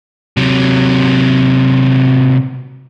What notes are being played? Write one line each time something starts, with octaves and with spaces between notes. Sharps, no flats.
C3 F#3